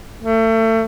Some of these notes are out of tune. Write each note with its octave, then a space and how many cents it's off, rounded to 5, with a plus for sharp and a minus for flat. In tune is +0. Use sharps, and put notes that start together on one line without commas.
A3 +30